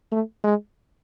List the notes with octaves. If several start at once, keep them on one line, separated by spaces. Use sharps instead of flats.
A3
G#3